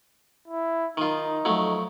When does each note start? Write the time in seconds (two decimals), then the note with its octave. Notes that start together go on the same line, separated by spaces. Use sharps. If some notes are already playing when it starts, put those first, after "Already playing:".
0.48 E4
0.97 D#3 D#4 F4
1.45 F2 F#3 A3